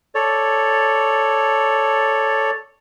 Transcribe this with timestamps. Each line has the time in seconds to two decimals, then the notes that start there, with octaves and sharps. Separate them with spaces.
0.15 A4 C#5 D5